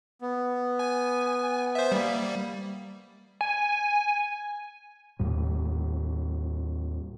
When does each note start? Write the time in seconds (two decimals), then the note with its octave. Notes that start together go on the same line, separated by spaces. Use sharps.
0.22 B3
0.79 G#5
1.75 C5 E5
1.92 G3 A#3
3.41 G#5
5.19 D#2 A2 G3